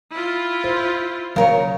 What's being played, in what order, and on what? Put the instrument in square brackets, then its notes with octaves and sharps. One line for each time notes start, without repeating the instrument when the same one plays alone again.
[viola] E4 F4
[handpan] C5
[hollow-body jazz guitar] C#3 A#4 C#5 [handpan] F#3